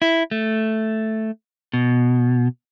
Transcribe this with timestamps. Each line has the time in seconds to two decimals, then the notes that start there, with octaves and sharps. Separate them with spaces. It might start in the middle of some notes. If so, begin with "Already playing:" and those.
0.02 E4
0.31 A3
1.73 B2